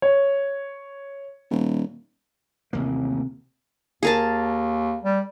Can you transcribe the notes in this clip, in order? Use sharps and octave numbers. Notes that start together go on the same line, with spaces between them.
C#5
D#1
A1 D#2 C3 A#3
D#2 G#4 A#4 A5
G3